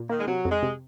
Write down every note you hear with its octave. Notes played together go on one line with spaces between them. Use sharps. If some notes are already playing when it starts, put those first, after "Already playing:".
Already playing: A#2
D#3 A#3
G#3
C3 F#3
F2
G#3
C3